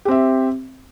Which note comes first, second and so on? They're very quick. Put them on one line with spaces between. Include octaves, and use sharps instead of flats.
G4 C4 E5